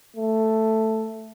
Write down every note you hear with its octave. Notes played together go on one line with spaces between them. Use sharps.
A3